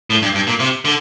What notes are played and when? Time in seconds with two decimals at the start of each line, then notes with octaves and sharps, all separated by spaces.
0.10 A2
0.22 G2
0.35 G2
0.47 A#2
0.60 C3
0.85 D3